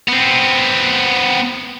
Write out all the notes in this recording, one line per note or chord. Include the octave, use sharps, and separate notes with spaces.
B3 C4